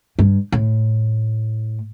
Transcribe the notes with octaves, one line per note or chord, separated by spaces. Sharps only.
G2
A2